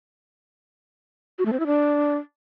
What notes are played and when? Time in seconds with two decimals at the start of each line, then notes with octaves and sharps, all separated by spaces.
1.39 F#4
1.46 A3
1.53 C4
1.60 E4
1.67 D4